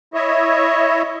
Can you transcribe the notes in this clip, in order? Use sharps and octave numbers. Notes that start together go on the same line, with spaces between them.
E4 C#5 D#5 E5